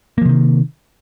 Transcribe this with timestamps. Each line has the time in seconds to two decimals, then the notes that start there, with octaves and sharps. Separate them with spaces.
0.18 A#3
0.22 F3
0.25 C3
0.29 D#3